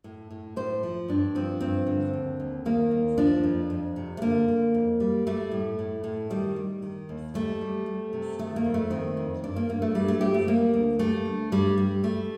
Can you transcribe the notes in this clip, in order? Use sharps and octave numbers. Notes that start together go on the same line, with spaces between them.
A2
A2
A2 C5
F3
G2 D4
F3 C4
G2 C4
D3
D#2
D#2
D#3 A#3
D#2
F3 D4
F2
F2
C3
A3
D3 A#3
D3
F2
G3
G3 A3
A2
A2
A2
D#3 G3
G3
D#3
D#2
G3 A3
G3
G3
C3
D#3 A3
A#3
F2
A3
D#3 C4
F2
G2 D4
A#3
G2 A#3
A3
G2 G3
A3
F3 G4
A3
G3 A#3
D2
G3 A3
D2
G2 G3
G3
G3 A3